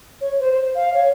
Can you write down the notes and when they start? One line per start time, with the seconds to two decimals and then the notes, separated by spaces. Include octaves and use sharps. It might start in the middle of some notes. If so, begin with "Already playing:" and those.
0.21 C#5
0.40 C5
0.53 C5
0.75 F5
0.94 C#5